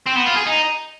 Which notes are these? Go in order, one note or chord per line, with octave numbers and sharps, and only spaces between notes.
C4
B3
F4
G#4
D#4